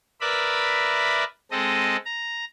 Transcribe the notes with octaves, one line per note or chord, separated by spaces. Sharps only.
A#4 B4 D5 E5 B5
G#3 C4 A4 D#5
A#5